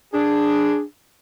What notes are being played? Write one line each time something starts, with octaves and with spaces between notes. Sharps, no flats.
D4 G#4